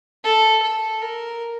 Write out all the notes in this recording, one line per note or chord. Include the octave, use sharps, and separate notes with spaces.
A4
A4
A#4